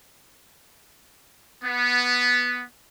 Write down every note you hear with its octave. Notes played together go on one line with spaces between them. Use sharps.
B3